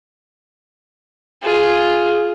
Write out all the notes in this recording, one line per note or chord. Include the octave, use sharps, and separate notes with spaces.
F4 G#4